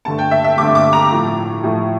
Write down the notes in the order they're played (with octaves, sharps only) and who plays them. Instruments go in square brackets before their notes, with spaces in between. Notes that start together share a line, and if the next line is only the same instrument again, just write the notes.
[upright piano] G2 D3 A3 A5
G5
E5
E5
G2 D3 A3 D6
D6
A#5
A2 F3 A3
A2 F3 A3